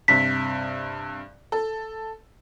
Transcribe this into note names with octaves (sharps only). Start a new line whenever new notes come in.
G2 C3 B6
A4